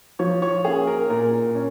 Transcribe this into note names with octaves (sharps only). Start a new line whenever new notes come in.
F3 C#5
C#5
A#3 C#4 G#4
A#4
A#2 A#4
C#4